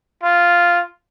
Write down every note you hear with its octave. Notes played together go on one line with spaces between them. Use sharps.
F4